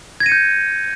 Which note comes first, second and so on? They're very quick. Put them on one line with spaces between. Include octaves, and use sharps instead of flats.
G#6 A#6 D#7 C#7 G6